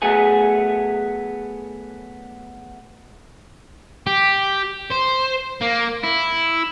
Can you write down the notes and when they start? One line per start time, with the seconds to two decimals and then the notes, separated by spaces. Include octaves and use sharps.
0.02 F#3 A3 B3 G#4
4.07 G4
4.91 C5
5.62 A#3
6.03 E4